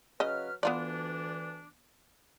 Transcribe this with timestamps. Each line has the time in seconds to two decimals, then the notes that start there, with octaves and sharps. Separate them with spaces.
0.20 C#3 F#3 B4 D#5 F6
0.63 D2 E3 B3 D4 F4 D5